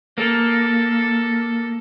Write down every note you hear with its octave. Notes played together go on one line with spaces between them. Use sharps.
A#3 A4